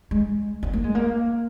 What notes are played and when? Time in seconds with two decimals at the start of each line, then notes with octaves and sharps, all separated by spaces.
0.11 G#3
0.63 C4
0.73 A#3
0.84 G#3
0.95 A#3